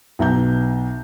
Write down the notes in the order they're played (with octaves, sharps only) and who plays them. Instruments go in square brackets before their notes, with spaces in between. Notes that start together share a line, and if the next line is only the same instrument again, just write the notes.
[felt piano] B1 E5 A#5 G6